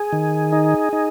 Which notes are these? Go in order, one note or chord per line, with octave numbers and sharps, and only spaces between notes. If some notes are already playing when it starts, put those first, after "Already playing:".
Already playing: G#4
D#3
D#4
D#4